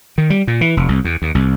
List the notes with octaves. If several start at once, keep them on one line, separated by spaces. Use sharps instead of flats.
D#3
G3
A#2
E3
F1
C2
E2
D#2
C2